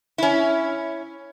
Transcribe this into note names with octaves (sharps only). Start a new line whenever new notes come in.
C#4 E4